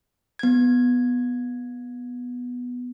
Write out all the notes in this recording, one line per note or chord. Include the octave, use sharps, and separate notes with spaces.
B3 G#6